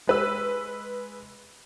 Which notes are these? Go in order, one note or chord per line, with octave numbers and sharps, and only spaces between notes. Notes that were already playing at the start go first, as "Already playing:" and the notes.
G#3 B4 E6